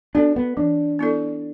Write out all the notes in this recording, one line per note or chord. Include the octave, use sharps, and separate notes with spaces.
B3 D4 F#4 A4 D5
B3
E3 D4
B3 E4 A4 D5